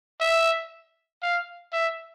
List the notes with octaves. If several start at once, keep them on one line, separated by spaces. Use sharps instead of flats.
E5
F5
E5